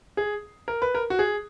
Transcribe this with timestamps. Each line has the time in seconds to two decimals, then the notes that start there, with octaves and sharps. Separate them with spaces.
0.17 G#4
0.68 A#4
0.82 B4
0.95 A#4
1.10 F#4
1.19 G#4